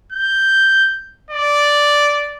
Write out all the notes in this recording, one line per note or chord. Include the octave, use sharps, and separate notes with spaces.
G6
D5